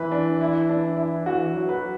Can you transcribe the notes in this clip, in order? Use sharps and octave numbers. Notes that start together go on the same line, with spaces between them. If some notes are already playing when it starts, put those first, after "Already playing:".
Already playing: E3 B4
D4
E4
D4
E4
E3 F#4
F#3
B4